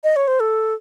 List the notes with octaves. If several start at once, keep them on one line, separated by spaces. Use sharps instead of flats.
D#5
C#5
C5
A4